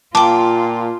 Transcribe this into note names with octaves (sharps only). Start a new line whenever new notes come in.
A#2 F4 G5 A5 D6